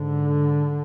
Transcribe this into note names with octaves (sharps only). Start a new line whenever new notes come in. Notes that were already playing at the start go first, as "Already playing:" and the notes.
Already playing: G#2 D3